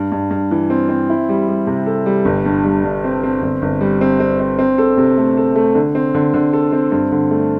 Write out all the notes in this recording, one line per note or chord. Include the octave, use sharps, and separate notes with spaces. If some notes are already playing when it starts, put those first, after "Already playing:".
Already playing: G2
G2
G2
E3
C4
C4
E4
G3
G3
C3
A4
G3
G1
G2
G3
G2
C4
C4
G1
G1
G3
C4
C4
C4
C4
A4
C3
A3
A4
A3
D3
C4
D3
D3
A4
C4
G2
D3
A3